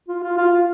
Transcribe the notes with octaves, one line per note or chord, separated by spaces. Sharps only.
F4
F4
F4